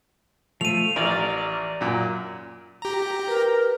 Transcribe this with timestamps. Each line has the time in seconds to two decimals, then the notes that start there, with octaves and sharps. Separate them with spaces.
0.61 F3 A3 D#7 F7
0.96 A1 A#4 D5
1.81 F#2 A#2
2.82 G4 A#5
3.28 A#4 B4